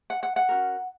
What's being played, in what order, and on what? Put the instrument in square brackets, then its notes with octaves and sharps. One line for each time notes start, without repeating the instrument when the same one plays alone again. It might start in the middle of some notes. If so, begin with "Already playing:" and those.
[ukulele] F#5
F#5
F#5
C#4 F#4 A#4